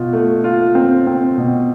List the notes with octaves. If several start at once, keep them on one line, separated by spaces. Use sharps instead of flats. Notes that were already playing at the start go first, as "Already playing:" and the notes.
Already playing: B2 F4
A3
F4
C4
C4
B2